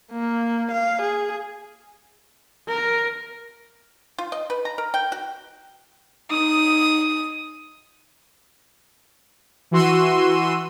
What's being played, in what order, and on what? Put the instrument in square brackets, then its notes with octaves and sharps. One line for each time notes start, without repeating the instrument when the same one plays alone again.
[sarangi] A#3
F5
G#4
[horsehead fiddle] A#4
[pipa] F4
D#5
B4
A#5
A#4
G5
F#4
[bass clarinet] D#4 [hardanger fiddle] D#6
[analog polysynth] E3 F#4 C6 E6 D#7